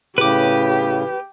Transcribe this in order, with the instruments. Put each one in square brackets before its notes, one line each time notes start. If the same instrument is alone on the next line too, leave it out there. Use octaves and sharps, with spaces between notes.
[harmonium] A2 C#3 [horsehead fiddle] G4 [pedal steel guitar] B4 D6